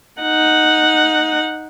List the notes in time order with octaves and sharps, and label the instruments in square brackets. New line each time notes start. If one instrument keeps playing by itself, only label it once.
[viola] D#4 F#5